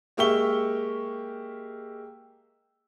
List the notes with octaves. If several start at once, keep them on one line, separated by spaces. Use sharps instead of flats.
G#3 A#3 G4 E5 C#6 G7